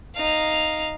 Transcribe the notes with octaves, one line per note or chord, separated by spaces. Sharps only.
D#4 F5